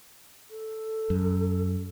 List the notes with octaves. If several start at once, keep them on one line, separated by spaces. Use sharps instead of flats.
A4
F#2